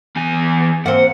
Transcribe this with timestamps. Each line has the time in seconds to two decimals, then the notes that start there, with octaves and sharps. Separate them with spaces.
0.16 E2 G#5
0.86 A#3 C4 F#5